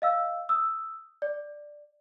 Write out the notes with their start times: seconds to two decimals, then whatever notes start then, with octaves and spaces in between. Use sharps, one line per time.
0.02 D#5 F5 E6
0.49 D#6 E6
1.22 D5